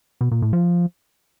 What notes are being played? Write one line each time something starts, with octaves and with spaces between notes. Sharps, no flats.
B2
A#2
A2
F3